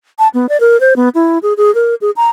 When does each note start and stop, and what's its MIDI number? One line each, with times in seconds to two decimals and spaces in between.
0.19 0.28 81
0.34 0.49 59
0.49 0.60 74
0.60 0.80 70
0.80 0.94 72
0.96 1.09 59
1.15 1.38 64
1.43 1.53 68
1.57 1.73 68
1.75 1.95 70
2.01 2.11 68
2.16 2.30 82